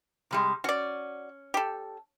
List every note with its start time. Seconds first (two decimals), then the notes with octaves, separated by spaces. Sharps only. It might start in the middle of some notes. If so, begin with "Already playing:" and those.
0.31 C3 G3 G#3
0.64 C#4 F#4 D5
1.54 G4 A4